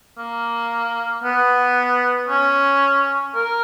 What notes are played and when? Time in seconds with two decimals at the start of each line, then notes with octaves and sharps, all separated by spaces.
0.18 A#3
1.24 B3
2.29 C#4
3.35 A#4